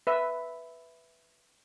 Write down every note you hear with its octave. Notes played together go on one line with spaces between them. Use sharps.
B4 E5